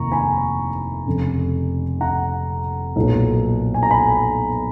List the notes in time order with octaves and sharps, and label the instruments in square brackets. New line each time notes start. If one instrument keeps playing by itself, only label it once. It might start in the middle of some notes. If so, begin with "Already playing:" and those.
Already playing: [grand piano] F1 D#2 C#3 A#3 A#5 C#6
G#5 B5
F1 F2 C#3
F#5 A#5
B1 A#2 F#3 B3
G#5
A#5
G#5 B5